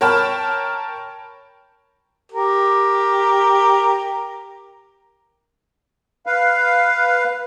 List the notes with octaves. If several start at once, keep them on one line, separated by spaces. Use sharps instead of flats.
A#4 C#5 G5 A5 B5 F6
G4 A#4
B4 F5